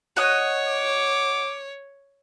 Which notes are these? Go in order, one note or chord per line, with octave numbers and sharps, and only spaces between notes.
F#4 C#5 D#5 D#6
D6